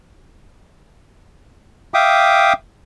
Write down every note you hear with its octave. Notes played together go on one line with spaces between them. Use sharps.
E5 F5 G5 D6 D#6